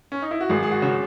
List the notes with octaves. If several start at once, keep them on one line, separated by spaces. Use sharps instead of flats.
C#4
D#4
E4
F#4
G#1 G#4
G#4
F#4
C#3